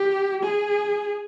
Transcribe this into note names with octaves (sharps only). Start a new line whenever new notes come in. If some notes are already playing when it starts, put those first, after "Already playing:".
Already playing: G4
G#4